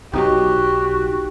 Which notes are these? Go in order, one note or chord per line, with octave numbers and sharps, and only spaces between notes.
B1 B2 F#3 D#4 F#4 G4